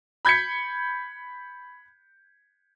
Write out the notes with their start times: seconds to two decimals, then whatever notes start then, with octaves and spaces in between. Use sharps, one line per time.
0.25 B5 G6 G#6 B6 C#7